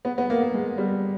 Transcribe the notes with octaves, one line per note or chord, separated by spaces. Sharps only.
B3
B3
A#3
A#3
G#3
G3